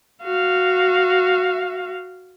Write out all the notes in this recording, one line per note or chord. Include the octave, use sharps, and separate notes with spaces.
F#4 F5